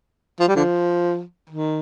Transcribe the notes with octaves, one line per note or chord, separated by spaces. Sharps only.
F3
G3
D3 F3
D#3